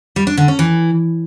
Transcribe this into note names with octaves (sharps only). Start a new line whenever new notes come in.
G3
D4
D3
C#4
E3